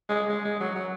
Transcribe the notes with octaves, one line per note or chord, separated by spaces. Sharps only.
G#3
G#3
G#3
F#3
F#3